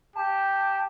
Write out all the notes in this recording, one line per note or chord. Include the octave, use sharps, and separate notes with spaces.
G4 A5